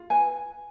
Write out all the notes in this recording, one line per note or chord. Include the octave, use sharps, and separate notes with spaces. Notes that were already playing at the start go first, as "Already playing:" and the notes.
Already playing: F4
B4 G#5